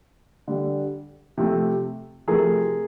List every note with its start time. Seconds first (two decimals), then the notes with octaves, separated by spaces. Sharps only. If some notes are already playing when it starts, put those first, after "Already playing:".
0.48 D3 G3
1.37 C3 F3 A3
2.28 C3 F3 A3 G#4 A#4